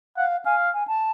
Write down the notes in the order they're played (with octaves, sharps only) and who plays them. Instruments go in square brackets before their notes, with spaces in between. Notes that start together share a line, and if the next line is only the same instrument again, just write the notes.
[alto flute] F5 [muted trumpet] F#5
[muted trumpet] F5 [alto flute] G#5
[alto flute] G#5
A5